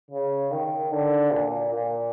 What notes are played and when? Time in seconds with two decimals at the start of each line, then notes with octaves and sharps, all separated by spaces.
0.11 C#3
0.52 D#3
0.93 D3
1.33 A#2
1.74 A#2